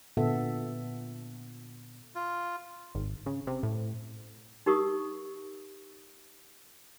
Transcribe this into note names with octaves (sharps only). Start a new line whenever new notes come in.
A#2 D3 B3 A4 E5
F4
G#1
C#3
C3
A2
D#4 G4 A#4 C#6 D#6